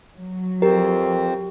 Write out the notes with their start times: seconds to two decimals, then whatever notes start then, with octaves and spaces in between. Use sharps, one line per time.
0.15 F#3
0.62 F2 C4 G4 A#4